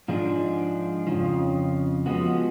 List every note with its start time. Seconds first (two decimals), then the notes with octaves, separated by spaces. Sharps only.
0.08 G#2 F3 G#3 D4
1.07 F2 C#3 F3
2.06 F3 G#3 B3 F#4